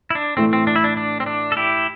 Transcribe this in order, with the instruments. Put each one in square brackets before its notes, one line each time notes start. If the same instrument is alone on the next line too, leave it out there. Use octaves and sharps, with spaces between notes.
[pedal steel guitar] E4
D4
[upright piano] A2 E3 A3 [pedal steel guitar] C4
[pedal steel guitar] C4
D4
E4
D4
D4
C4
D4
A4
E4 G4